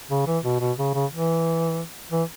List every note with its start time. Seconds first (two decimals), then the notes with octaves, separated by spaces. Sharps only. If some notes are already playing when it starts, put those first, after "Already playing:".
0.10 C#3
0.27 E3
0.44 B2
0.60 B2
0.78 C#3
0.94 C#3
1.10 E3
2.12 E3